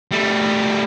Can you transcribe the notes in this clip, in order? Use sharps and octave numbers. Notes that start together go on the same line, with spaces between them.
G3 A3